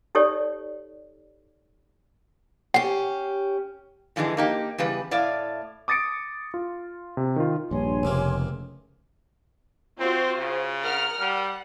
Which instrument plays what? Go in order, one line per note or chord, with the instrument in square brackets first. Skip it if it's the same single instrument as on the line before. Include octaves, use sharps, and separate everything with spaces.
[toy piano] D#4 G4 A4 C#5 D5
[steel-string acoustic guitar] C#4 G4 [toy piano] F#5
[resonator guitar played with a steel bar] F2 G#2 D3 E3 G#3
A#3 D#4 G4
E2 C#3 G3 B4
A2 D5 E5 F5
[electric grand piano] D6 D#6 A6 A#6 C#7 D7
F4
C3
D#3 F4
[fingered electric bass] A#1 G2 [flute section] C#5 G#5 C6
[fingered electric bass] F1 [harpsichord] C#2 C3 A#3
[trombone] C4 [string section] F4 F#4 C5
[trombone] C#3
[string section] A#4 F#5 F6
[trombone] G3 [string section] F#5